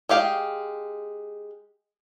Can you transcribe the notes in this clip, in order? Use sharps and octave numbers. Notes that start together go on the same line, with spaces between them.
G#3 G4 F5 G5